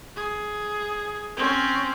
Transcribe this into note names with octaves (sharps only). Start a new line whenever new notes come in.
G#4
C4 C#4